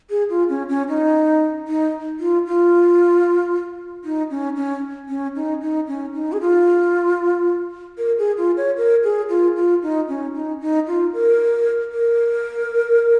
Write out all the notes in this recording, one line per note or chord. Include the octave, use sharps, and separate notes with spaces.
G#4
F4
C#4
C#4
D#4
D#4
F4
F4
D#4
C#4
C#4
C#4
D#4
D#4
C#4
D#4
G#4
F4
A#4
G#4
F4
C#5
A#4
G#4
F4
F4
D#4
C#4
D#4
D#4
F4
A#4
A#4